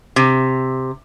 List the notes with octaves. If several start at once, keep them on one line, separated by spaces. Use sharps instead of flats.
C3